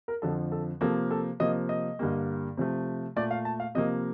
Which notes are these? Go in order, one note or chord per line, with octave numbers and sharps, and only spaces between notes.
A#4
F2 D3 F3 A4
A4
C3 F3 A#3 A4
A4
C3 F3 A#3 D#5
D#5
G2 D3 G3 A#3
C3 F3 A3
A#2 A3 D5
F5
A5
F5
C3 F3 A#3 D#5